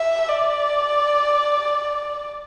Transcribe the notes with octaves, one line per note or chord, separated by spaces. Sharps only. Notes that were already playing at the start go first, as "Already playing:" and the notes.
Already playing: E5
D5